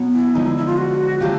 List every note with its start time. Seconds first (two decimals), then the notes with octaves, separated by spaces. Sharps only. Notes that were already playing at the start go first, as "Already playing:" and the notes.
Already playing: B2 F#3 B3
0.13 E4
0.35 D3 F3 G#3 D#4
0.46 E4
0.57 E4
0.67 F4
0.78 F#4
1.20 D3 F#3 A3 C4 F4 G4